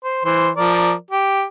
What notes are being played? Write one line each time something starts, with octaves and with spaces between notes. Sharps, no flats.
C5
E3 C5
F3 A#4 D5
G4